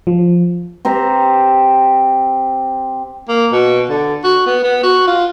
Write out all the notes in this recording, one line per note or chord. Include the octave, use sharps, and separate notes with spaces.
F3
C4 G4 C5 A#5
A#3
B2
D3
F#4
B3
B3
F#4
F4